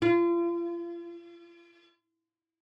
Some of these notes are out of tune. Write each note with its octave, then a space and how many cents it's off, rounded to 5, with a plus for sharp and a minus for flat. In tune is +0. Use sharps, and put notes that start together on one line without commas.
F4 -40